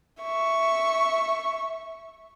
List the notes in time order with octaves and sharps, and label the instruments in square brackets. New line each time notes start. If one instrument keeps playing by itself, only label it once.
[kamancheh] E5 C#6